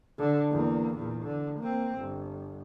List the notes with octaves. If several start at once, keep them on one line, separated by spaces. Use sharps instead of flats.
D3
E2 A#3
E2 A#2
D3
A#3 C4
G1